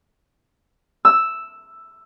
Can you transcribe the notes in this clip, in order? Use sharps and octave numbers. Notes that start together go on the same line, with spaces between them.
E6